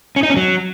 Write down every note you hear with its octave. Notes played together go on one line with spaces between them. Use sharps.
C#4
D#4
C#4
F#3